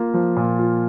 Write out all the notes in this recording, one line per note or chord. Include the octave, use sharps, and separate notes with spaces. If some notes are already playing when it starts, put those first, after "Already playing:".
Already playing: A#3 F4
F3
A#2
F4